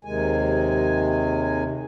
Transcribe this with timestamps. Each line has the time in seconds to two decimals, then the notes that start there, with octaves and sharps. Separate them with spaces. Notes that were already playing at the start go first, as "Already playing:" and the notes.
0.05 D#2 C3 D#3 G#3 G#5